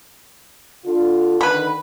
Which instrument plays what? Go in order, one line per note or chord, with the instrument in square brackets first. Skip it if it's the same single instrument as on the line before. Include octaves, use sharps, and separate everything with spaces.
[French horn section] D3 F4
[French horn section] D3 D#3 [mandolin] B4 B5